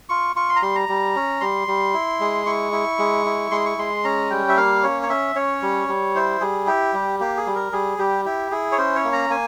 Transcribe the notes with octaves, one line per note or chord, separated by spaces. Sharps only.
F4 C#6
F4 C#6
C6
A#5
G3 C6
A#5
G3
C#4
G3 C6
G3
E4
G#3
E4 C#6
E4
G#3
E4
G#3 C6
C#6
G#3 C6
C#4 A#5
G3 G5
E5
A#3 F5
C#4 C#5
C#5
C#4 E5
C#4 C#5
G3
G3
E4 C5
G3 G#4
E4 G4
G3
A#3 G4
G#4
G3
A#4
G3 G#4
G3 G4
E4 G4
E4 G#4
C#5
C#4 C5
C#5
A#3
A#5
A#3 G#5